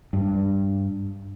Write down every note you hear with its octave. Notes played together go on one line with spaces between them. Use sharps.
G2